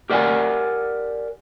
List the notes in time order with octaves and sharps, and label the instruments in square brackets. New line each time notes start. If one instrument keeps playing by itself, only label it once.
[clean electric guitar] G4 A#4 D5 F#5 G#5